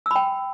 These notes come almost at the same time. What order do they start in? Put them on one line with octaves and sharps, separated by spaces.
E6 B5 G5